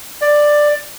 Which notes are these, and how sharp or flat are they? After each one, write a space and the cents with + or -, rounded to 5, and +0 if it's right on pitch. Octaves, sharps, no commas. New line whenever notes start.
D5 +10